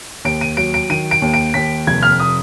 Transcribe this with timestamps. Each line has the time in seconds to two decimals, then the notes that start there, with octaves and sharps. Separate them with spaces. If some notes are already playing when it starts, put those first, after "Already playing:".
0.24 D#2 D7
0.41 D#7
0.57 F#3 D7
0.74 D7
0.90 D#3 D#7
1.11 D7
1.22 D#2
1.34 D7
1.54 D#2 B6
1.87 F1 G#6
2.03 F6
2.20 D#6